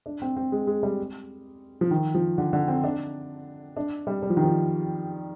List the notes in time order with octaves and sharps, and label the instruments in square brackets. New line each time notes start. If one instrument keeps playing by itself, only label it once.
[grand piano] D4
C4
C4
G#3
G#3
G3
F3
D#3
F3
D3
D3
C4
D4
D4
G3
G3
F3
D#3
F3